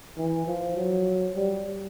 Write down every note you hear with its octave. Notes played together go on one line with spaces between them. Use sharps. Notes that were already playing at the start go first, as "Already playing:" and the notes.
E3
F3
F#3
G3